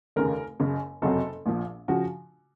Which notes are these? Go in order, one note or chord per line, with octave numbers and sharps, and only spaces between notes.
F1 D#2 C#3 A#4
F#1 F#2 C#3
F#1 F2 C3 F#3 A4
A#1 A#2 F3
C#3 F3 F#4